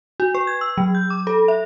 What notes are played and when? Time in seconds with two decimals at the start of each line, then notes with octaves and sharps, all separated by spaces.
0.20 F#4
0.35 B4
0.47 G#6
0.61 E6
0.77 F#3
0.95 G6
1.10 D6
1.27 A4
1.48 E5